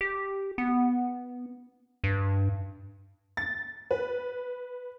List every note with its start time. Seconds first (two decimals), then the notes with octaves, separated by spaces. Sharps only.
0.01 G4
0.58 B3
2.04 G2
3.37 A6
3.91 B4